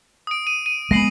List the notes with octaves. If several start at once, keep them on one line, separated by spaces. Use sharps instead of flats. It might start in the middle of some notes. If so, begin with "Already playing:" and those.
D#6 D7
D#7
D#7
G#3 B3 A#6 C7 F#7